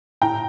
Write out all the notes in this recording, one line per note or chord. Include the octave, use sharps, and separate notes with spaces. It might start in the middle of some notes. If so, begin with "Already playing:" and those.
A2 G5 A#5